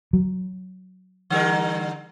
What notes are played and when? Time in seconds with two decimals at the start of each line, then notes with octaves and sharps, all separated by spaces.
0.13 F#3
1.30 D3 G3 A#4